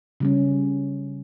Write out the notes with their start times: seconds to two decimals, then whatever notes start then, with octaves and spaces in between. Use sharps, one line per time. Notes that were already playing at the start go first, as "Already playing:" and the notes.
0.20 C#3 G3 C#4